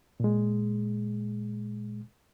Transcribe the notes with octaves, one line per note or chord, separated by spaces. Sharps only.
A#2 G#3